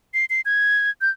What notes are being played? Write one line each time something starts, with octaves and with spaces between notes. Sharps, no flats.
C7
C7
G#6
G6